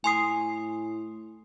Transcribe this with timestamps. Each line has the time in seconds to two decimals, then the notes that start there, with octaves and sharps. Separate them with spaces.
0.04 A2 G#5 C6 D#6 C7 F7